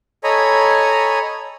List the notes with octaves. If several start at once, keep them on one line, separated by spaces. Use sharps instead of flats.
A4 C#5 D#5 G#5 A#5 B5